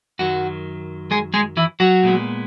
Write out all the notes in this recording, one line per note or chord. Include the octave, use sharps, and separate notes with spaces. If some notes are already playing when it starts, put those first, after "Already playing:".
F#2 D#3 F#3 F#4
G#3 G#4
G#3 G#4
E3 E4
F#3 F#4
A#2 G#3 B3